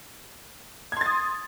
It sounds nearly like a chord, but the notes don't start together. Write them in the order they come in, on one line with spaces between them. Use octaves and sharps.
G#6 C6 A6 D#6